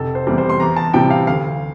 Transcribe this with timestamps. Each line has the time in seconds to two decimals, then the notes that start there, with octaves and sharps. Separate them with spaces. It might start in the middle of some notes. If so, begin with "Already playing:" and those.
Already playing: F1 A4
0.15 C5
0.27 E2 C3 G3
0.38 C5
0.50 C6
0.60 E2 A#5
0.76 A5
0.94 C3 G3 G5
1.10 F5
1.27 D2 F5